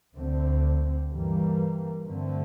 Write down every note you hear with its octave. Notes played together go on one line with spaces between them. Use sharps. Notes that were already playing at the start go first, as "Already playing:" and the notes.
D2 D3 A3 C4
G2 E3 G3 A#3
G2 D3 A3 C4